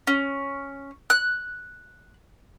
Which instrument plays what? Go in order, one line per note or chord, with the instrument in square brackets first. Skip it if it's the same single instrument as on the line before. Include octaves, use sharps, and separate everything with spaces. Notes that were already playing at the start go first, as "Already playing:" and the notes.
[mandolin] C#4
F#6